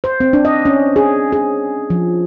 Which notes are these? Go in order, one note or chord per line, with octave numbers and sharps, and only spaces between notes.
C5
C4
D4
D#5
C#4
G#4
G#4
F3